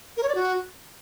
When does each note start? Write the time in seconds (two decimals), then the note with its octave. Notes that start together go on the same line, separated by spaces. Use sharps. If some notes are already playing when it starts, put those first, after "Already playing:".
0.17 A#4
0.23 C#5
0.29 D5
0.35 F#4